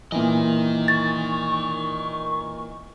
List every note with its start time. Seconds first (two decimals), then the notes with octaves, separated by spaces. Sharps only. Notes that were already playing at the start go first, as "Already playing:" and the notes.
0.12 A#2 E3 A#4 D#5
0.88 C#6 A6